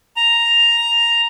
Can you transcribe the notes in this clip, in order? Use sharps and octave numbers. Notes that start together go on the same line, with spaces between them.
A#5